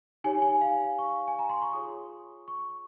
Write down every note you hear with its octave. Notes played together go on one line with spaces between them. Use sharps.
D#4 G4 C#5 G#5
G#5
F5
C#6
G#5
A#5
C6
C#6
F4 G#4 C#5 D#6
C#6